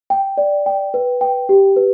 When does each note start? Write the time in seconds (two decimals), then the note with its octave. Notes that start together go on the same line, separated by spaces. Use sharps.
0.10 G5
0.37 D5
0.66 G5
0.94 B4
1.21 G5
1.49 G4
1.76 B4